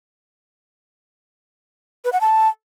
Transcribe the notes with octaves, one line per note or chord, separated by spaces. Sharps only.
B4
F#5
A5